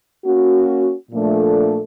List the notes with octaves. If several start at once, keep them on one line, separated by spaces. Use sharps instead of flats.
A#3 C#4 F#4
A#2 F3 A3 D4